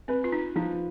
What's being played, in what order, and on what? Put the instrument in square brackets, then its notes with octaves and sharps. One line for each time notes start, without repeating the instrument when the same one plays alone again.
[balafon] C4 [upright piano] B4
[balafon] F4
D#4
[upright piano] F3 [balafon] D#4